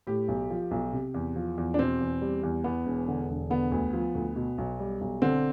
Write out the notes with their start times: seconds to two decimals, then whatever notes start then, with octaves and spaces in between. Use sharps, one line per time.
0.07 A2 G4
0.28 B1
0.50 F3
0.71 B1
0.93 C3
1.14 E2
1.36 F3
1.58 E2
1.74 D4
1.79 B2 C4
2.01 E2
2.22 G3
2.43 E2
2.64 E2 B3
2.86 E1
3.08 D3
3.30 E1
3.50 D3 B3
3.72 D2
3.93 F3
4.15 D2
4.36 B2
4.58 B1
4.79 G3
5.01 B1
5.22 D3 C4